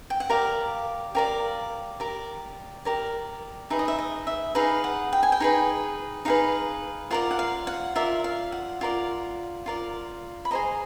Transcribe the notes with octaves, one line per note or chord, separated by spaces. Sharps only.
G5
F#5
G4 A#4 D5 F5
G4 A#4 D5 F5
G4 A#4 D5
G4 A#4 D5
D#4 G#4 B4 E5
D#5
E5
D#5
E5
D#4 G#4 B4 F5
F#5
G5
G#5
G5
D#4 G#4 B4
D#4 G#4 B4 F5
F4 A#4 D5 F#5
F#5
F5
F#5
F4 A#4 D5 E5
F5
F#5
F4 A#4 D5
F4 A#4 D5
B5
G#4 C5 D#5 A#5